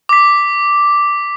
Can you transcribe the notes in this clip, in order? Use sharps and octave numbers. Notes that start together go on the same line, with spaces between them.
D6 B6